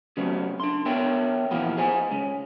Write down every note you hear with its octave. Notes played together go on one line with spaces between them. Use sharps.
C#3 F#3 G3 A3 B3 C4
D4 C6
B3 A#4 C#5 E5 G5
A#2 E3 F3 A#3 B3
G#4 C5 D#5 G#5
C#3 G#3